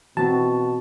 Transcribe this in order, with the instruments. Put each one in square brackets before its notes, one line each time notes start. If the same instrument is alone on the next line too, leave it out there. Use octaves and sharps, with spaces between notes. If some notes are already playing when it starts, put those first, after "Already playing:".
[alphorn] B2 [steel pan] E3 B3 C4 [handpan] F#4 [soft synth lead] A5